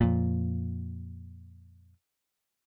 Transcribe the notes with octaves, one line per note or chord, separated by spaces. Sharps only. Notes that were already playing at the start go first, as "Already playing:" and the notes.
F2 A#2